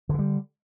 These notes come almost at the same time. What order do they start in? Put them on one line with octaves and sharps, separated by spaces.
D3 E3 G3